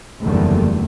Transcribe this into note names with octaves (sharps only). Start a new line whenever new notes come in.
F#1 E2 D3 D#3 G3 A3